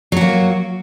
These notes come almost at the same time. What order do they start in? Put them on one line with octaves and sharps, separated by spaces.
F#3 F#4 A#3